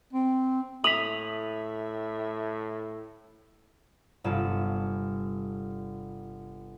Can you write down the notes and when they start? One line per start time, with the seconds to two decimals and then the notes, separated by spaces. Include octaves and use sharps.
0.13 C4
0.84 A2 E5 D#6 B6 F7 F#7
4.24 G1 G2 C3 F4 E7